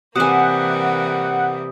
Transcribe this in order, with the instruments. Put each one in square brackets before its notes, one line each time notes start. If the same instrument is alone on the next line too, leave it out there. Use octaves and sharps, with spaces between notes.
[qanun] C3 G#5 [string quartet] E3 G3 A#3 [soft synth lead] F#5 [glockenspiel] D#6